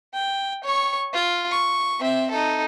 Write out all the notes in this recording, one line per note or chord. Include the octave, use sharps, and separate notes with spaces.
G5
C#5 C#6
F4
C#6
C4 E5
D#4 A4